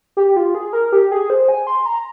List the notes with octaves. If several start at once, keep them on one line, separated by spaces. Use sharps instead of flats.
G4
F4
G#4
A#4
G4
G#4
C5
G#5
C6
A#5